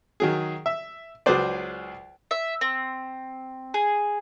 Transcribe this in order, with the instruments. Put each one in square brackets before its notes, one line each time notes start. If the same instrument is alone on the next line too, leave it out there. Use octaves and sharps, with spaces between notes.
[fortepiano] D#3 F#3 G#4
E5
C#2 F#3 G#4 B4 C5 D5
[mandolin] E5
C4
G#4